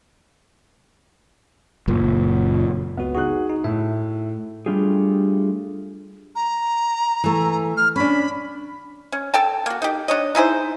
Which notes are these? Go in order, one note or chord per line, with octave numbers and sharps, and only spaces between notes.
F#1 A#2
C#2 B3 F#4
D#4 F#4 G#4 F#6
D#4
A2 E5
G3 A3 D4 F4 G4 G#4
A#5
E3 A3
F6
C#4 D4 B5
C#4
A4 G5 A5
A#3 F#4
D#4 G4
D4 C#5 D#5
D#4 E4 G#4 C5